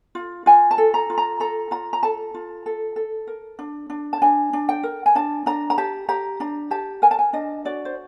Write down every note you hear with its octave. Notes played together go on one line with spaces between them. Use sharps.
F4
F4 G#5
A5
A4
A#5
F4
A#5
A4 A#5
F4 A#5
A#5
A4 A5
F4
A4
A4
A#4
D4
D4
A5
D4 G#5
D4
G5
A#4
G#5
D4 A5
D4 A#5
A#5
G4 A5
G4 A#5
D4 A#5
G4 A5
A#4 G#5
A5
G#5
D4 D#5
F#4 D5
C5